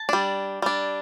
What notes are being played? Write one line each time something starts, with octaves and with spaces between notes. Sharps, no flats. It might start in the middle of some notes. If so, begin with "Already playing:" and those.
Already playing: A5
G3 D4
G3 D4